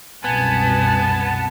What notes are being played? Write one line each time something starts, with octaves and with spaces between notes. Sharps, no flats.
C2 F#2 B2 B3 G#5 A5